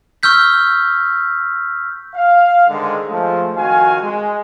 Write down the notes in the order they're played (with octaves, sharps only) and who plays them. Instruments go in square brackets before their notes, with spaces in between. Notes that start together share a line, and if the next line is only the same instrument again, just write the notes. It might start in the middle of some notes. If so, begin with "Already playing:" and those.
[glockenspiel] C#6 E6 F6 G6 B6
[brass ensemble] F5
G#2 D3 D#3 G#3
F3 G#3 A3
F2 D#3 F#4 F5 G#5
G#3